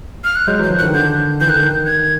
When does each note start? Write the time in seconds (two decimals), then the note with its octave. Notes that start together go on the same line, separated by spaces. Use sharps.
0.24 F6
0.36 F#6
0.47 F#3 G#3 G6
0.59 E3 F#3 G6
0.71 D#3 F3
0.78 F#6
0.82 D3 E3
0.88 D#3
0.94 D3 G6
1.41 E3 G6
1.48 D#3 F#6
1.55 D3 G6
1.63 D#3
1.87 G#6